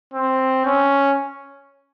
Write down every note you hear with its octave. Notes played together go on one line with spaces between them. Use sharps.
C4
C#4